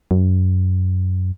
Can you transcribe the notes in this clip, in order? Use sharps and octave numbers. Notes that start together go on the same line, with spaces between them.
F#2